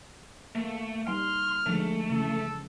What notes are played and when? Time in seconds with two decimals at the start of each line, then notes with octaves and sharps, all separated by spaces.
0.55 A3 A#3
1.08 G3 D#4 C6 F6
1.66 D3 F3 G#3 A3
2.10 C#3 E3 A4